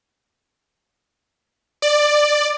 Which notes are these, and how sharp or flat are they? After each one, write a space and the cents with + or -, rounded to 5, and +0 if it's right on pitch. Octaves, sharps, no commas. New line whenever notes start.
D5 +15